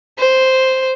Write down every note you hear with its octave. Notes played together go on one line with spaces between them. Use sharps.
C5